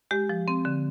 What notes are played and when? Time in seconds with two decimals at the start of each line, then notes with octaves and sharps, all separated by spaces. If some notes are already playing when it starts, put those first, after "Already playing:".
0.11 G#3 G4
0.29 F3
0.48 C4
0.65 D3